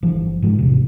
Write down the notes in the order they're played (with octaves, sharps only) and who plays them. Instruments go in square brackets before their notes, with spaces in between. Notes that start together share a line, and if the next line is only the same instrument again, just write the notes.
[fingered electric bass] G1 E3 F3
G#2 F3 G#3
A1 E2 C3